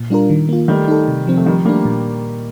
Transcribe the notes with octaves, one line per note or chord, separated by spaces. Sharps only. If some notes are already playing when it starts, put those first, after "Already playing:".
Already playing: A#2
G3 D4 F4 A#4
D#3
A#3 F4
D#3 G3 A3
D#4 A4
C3
F3 C4
A3
D#3 F3 G3
G3 A3 A#3 D4
A#2